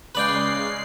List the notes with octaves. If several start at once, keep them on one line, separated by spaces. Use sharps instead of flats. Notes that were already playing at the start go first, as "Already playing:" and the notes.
C#3 G#3 B4 D5 G5 C7